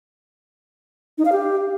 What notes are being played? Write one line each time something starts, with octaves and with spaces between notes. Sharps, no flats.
D#4
F5
G4